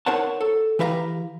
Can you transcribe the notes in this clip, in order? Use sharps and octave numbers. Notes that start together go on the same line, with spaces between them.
D#4 A#4 C5 C#5 F#5 A5
A4
E3 G4 B4 E5 F5 A#5